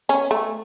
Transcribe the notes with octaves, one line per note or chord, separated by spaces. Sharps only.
C#4
A3